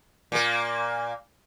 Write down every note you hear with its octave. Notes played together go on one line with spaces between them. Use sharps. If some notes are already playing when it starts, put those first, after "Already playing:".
A#2 A#3